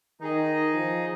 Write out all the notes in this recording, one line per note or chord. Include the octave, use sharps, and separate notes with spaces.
D#3 D#4 G#4 D#5
F3